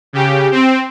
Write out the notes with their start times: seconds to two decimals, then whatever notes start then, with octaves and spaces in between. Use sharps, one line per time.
0.13 C#3 G4
0.52 C4